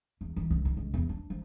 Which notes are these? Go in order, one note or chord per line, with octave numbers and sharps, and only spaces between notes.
E2
E3
C#2
D#3
C#2
E2
D4
F3